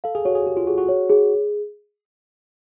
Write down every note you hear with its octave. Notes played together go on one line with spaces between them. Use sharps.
A4 F5
G#4
F#4 C#5
G#4
G4 G#4
F4
F#4 G#4
F#4
C#5
G#4